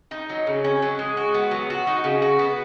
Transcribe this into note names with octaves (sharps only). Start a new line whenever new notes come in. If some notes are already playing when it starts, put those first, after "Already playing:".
D#4
F#3
C#3
C#4
F#3
G#3
F#4
B3
F#3
F#4
D#4
C#3
F#4
B3